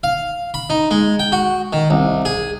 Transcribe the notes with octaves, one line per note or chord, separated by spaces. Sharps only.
F5
B5
D#4
G#3
G5
F#4
D#3
C2
G#4